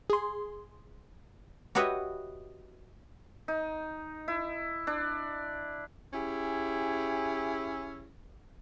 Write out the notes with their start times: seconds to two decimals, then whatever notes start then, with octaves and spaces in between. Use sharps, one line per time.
0.10 G#4 C6
1.75 F#4 G4 B4 C#5 D#5 E5
3.48 D#4
4.28 E4
4.87 D4
6.13 C#4 E4 G4 G#4